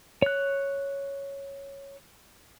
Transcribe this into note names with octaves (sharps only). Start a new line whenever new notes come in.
C#5 F#6